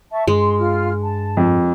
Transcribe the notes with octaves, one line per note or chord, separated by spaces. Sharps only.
E5 A5 C#6
G2 G#3 C6
F4 F6
A5
F2